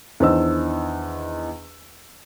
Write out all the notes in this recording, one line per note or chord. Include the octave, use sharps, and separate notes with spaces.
E2 D#3 D4 C5 D#5 E6